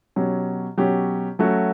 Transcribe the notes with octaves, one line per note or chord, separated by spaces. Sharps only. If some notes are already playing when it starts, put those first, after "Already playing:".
B2 F#3 C#4 G4
B2 F#3 C#4 G4
F#3 A3 C#4 F#4